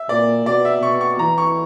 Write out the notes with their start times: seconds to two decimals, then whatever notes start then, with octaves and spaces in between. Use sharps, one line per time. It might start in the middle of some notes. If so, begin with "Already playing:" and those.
Already playing: E5
0.09 A#2 D5
0.46 B2 D5
0.65 E5
0.82 B2 C#6
1.01 C#6
1.19 E3 A#5
1.38 C#6